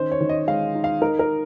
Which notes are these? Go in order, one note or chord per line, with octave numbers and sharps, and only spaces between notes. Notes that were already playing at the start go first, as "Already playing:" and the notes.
Already playing: D#3 C#4 C5
C#5
D#3
D#5
G#3 F5
D#4
F5
D#4 A#4
A#4